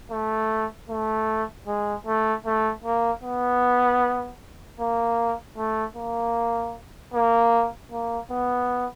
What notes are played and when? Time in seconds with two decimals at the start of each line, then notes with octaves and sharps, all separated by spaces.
0.11 A3
0.89 A3
1.67 G#3
2.07 A3
2.46 A3
2.84 A#3
3.23 B3
4.80 A#3
5.58 A3
5.96 A#3
7.14 A#3
7.92 A#3
8.31 B3